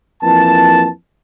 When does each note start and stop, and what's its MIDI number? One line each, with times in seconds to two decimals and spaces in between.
0.22 0.87 41
0.22 0.87 52
0.22 0.87 58
0.22 0.87 81